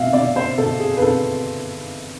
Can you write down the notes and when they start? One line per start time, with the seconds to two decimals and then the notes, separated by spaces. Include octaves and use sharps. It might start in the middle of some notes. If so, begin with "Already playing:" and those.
Already playing: B2 E5 F5
0.13 B2 D5
0.36 C5
0.58 B2 A4
0.80 G#4
0.97 B4
1.01 B2 A4